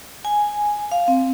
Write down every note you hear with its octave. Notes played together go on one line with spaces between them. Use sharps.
G#5
F5
C4